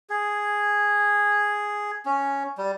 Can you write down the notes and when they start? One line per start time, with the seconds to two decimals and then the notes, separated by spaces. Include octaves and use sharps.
0.10 G#4
2.05 C#4
2.58 G3